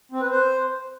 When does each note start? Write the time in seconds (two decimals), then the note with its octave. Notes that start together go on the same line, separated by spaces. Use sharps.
0.12 C4
0.21 B4
0.31 C5